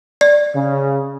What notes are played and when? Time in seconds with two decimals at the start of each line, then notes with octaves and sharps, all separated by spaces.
0.21 D5
0.54 C#3